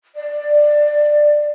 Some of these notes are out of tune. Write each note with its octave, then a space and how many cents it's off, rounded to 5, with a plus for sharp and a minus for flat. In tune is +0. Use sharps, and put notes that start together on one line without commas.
D5 +15